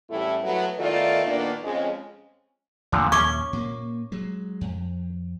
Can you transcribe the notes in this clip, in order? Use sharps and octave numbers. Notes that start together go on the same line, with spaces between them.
E2 A2 C#3 G3 A3 E4
F#3 A3 B3
D#3 A3 B3 E4 F4 D5
A#2 D#3 A#3 B3 D4
F2 C#3 G#3
E2 A#2 D3 F3 A3
D#2 A#2 C#4 C#6 D6
A#2 A#3
F#3 G#3
F2